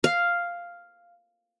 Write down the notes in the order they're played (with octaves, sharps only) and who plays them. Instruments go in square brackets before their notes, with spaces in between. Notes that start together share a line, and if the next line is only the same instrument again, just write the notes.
[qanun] F5